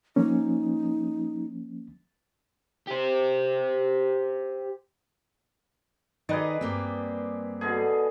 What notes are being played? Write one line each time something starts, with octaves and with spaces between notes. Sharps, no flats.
F3 A#3 C#4 D#4
G4 C5
D#3 D#4 G#4 B4 D5 D#5
G2 A#3 C4
B2 D3 G#4